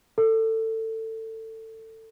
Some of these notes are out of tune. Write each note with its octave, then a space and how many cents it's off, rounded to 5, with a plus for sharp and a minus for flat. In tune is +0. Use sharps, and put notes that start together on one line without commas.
A4 +20